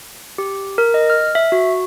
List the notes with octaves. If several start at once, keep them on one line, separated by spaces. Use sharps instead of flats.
G4
A#4
D#5
F6
E5
F#4